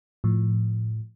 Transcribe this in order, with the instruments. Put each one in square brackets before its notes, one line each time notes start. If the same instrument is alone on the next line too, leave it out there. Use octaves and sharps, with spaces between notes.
[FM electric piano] A2 F3